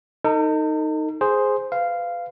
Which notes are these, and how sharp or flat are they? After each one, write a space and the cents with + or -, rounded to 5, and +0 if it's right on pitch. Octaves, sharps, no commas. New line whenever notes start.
D#4 +0 A4 +45
G#4 +0 C5 +0
B4 +20 F5 -10